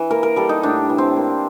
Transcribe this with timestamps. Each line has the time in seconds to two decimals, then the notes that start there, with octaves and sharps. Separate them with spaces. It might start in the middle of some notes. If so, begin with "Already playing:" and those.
Already playing: E3
0.11 A#3 A#4
0.23 A#4
0.36 G3 A4
0.49 D#4
0.63 A2 D4
0.90 E3
0.98 C4
1.16 A#3